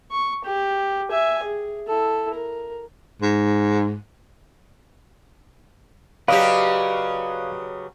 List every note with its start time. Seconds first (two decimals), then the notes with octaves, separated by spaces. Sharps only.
0.11 C#6
0.44 G4
1.11 E5 G#5
1.43 G#4
1.87 E4 A4
2.34 A#4
3.22 G#2
6.28 C#3 F#3 G4 B4 D5 D#5 F5